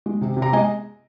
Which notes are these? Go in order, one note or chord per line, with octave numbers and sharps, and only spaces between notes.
G#3
C3
C3
A#5
G#3 D#5 G#5